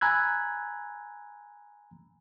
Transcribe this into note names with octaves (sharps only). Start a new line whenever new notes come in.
G#5 A#5 B5 E6 F#6 G#6